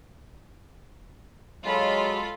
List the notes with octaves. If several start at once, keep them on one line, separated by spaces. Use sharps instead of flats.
F#3 G#3 F4 A4 B5